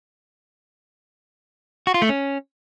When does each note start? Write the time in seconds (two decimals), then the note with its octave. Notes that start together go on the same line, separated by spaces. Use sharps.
1.87 F#4
1.94 F4
2.02 A3
2.09 C#4